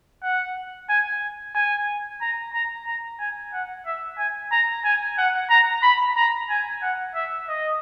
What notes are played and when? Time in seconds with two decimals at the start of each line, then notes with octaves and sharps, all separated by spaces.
0.23 F#5
0.89 G#5
1.55 G#5
2.21 A#5
2.54 A#5
2.86 A#5
3.20 G#5
3.53 F#5
3.86 E5
4.18 G#5
4.52 A#5
4.85 G#5
5.18 F#5
5.50 A#5
5.83 B5
6.17 A#5
6.49 G#5
6.82 F#5
7.15 E5
7.49 D#5